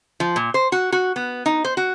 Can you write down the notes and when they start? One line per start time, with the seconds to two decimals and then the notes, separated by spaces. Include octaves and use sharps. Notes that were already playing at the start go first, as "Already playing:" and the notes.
0.20 F3
0.36 A#2
0.54 C5
0.72 F#4
0.92 F#4
1.16 B3
1.46 D#4
1.65 C5
1.77 F#4